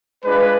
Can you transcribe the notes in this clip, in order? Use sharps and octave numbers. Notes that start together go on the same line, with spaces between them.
G#3 D4 F4 B4